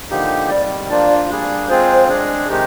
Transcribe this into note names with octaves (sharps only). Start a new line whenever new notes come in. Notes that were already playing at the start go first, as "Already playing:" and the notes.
D3 F3 A#3 D#4 G4
C3 D#3 G3 D5
F3 A#3 D4 F4 D5
G3 A#3 D4 G#4
G#3 C4 F4 G#4 C5
G#3 D4 G#4
C3 D#3 G#3 D#4 G4